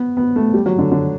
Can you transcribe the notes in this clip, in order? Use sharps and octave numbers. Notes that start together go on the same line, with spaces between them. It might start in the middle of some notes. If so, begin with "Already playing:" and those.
Already playing: B3
B3
A3
G3
F#3
D3
D3